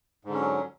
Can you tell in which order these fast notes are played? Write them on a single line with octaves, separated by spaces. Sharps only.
G#2 D3 C#4 F#3